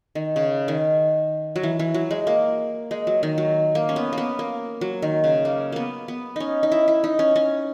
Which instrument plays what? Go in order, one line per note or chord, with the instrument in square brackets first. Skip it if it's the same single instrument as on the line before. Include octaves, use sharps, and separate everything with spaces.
[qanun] D#3
C#3
D#3
F#3
E3
E3
F#3
G#3
A#3
G#3
F#3
D#3
F#3
A#3
C#4
B3
A#3 B3
A#3
F#3
D#3
C#3
A#3
A#3 B3
B3
C#4 D#4
D#4
E4
E4
D#4
C#4
C#4